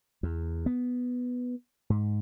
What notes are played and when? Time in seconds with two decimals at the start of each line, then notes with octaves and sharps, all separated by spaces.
0.23 E2
0.66 B3
1.90 G#2